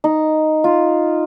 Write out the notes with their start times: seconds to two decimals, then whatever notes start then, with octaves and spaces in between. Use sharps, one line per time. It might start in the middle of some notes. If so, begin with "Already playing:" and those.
0.04 D#4
0.64 F4